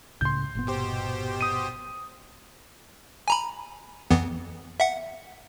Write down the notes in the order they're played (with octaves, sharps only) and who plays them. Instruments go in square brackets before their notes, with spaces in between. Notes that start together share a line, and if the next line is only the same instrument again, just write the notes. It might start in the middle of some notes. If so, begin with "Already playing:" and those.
[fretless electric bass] C#2 A2 C#3 [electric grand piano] C6 G6
[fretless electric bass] G1 A#2 B3
[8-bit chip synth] B2 G4 C5
[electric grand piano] D#6 D#7
[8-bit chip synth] G#5 A#5 B5
F2 E3 B3
E5 F#5